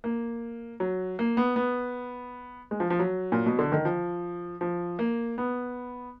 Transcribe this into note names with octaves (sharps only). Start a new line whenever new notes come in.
A#3
F#3
A#3
B3
B3
G#3
F3
F3
F#3
A#2
B2
D3
D#3
F3
F3
A#3
B3